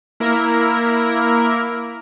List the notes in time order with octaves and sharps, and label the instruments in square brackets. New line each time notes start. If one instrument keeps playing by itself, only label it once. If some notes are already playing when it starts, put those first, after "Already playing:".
[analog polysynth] A#3 E4 A#4